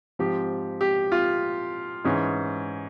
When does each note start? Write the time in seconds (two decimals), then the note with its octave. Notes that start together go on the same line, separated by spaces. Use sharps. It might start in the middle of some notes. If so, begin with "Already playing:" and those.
0.19 G#2 F3 C4 G4
0.81 G4
1.12 F4
2.04 G#2 E3 G#3 C#4